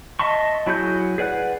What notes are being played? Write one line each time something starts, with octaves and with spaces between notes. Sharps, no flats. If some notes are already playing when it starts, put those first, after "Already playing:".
D#5 E5 A5 C6 C#6
F#3 E4 F#4 G#4 G6
G#4 B4 D5 F#5 F#6